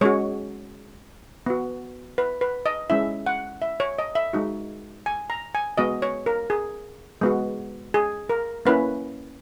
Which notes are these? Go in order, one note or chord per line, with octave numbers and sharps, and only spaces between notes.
G#3 C#4 F#4 C#5
B3 F#4
B4
B4
D#5
G#3 C#4 E4 E5
F#5
E5
C#5
D#5
E5
G#3 D#4 F#4
G#5
A#5
G#5
G#3 B3 F#4 D#5
C#5
A#4
G#4
G#3 B3 F#4
G#4
A#4
A#3 C#4 E4 B4